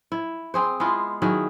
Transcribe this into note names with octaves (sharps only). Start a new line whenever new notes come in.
E4
C4 G#4 C5
G#3 B3 E4 F4
D#3 F#3 E4 G#4